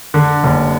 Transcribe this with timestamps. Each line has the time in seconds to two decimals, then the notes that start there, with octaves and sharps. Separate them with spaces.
0.14 D3
0.44 F#1